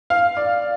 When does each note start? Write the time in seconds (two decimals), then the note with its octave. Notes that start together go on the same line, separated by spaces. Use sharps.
0.10 F5
0.37 D5